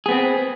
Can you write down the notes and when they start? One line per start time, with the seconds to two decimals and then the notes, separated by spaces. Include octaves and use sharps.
0.06 G#4
0.08 B3
0.11 C4